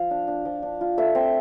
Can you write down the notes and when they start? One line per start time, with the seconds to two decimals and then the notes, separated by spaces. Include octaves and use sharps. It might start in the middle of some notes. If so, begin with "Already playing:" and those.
Already playing: F3 F5
0.11 D4
0.28 D4
0.45 F3
0.63 D4
0.81 F4
0.98 A3 E5
1.15 C4